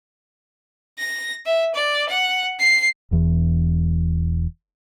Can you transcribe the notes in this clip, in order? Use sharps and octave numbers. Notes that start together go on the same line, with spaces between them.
A#6
E5
D5
F#5
C7
E1 E2 E3